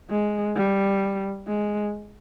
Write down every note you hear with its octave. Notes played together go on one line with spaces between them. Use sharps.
G#3
G3
G#3